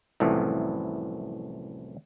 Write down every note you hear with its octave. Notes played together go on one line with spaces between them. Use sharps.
C2 F#2 A2 E3 F3